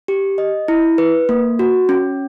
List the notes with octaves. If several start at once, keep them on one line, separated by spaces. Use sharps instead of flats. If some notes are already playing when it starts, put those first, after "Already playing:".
G4
D#5
E4
B4
A#3
F#4
C#4